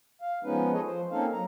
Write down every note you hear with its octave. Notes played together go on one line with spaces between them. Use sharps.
F5
F3 G#3 B3 C#4 D#4 B4
G#4 A4 C#5 D#5
F3 C5
A#3 C4 C#4 D#4 A4 F5
F#3 A#5